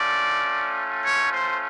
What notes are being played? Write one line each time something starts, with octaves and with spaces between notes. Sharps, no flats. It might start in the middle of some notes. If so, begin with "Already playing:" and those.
Already playing: A3 C#4 F4 D5
C#5
C5